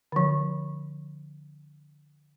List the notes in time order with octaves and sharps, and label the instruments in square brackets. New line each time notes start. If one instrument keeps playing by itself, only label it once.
[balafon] D3 F3